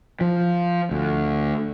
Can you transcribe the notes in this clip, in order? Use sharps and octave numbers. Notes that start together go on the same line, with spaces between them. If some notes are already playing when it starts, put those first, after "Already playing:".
F3
D2